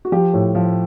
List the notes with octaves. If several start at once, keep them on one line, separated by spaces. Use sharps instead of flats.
F#4
F3 G4
A2
F3